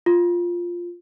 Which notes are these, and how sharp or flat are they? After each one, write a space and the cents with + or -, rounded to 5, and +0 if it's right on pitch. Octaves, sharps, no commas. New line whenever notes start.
F4 +0